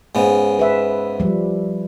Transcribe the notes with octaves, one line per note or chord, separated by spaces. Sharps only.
G#2 C#3 B3
B4 E5
F3 G3